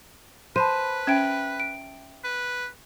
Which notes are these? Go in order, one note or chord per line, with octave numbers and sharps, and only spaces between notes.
B4 C5 A5 B5 D#7
C#4 E5 G5 D7
D7
B4